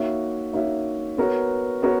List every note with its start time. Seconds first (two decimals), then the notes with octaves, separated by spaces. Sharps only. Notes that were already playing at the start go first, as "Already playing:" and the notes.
Already playing: A#3 D#4 F#4 C#5 E5
0.53 A#3 D#4 F#4 C#5 E5
1.17 B3 F#4 A#4 C#5
1.82 B3 F#4 A#4 C#5